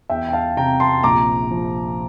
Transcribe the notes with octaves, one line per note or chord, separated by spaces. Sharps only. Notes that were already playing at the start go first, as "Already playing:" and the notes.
E2 E5 G5
G5
F5 A5
C3 G5 A#5
A5 C6
A#1 A#5 D6
F3